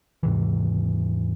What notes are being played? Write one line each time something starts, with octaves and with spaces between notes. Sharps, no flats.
D#2 G#2 C3 E3